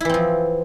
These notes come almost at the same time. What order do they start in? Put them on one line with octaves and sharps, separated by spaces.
E4 E3 C4 F3